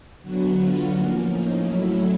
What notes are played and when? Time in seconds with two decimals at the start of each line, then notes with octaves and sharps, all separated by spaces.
0.22 D3 F#3 B3 F#4
0.57 F4
0.92 A2 F3 A#3 C#4
1.27 D#4
1.63 A2 F#3 A3 C#4 E4